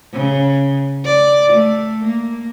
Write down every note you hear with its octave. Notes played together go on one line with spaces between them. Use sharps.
C#3
D5
A3
A#3